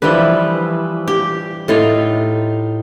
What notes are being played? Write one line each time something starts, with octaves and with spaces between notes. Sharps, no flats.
E3 F3 G3 B4
G4
A2 D#4 F4